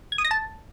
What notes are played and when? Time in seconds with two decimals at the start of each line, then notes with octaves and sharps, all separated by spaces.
0.12 G#6
0.18 D#6
0.25 A#6
0.31 A5